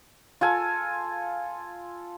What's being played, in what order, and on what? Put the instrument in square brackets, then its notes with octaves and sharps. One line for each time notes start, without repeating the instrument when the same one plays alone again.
[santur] F4 A4 G#5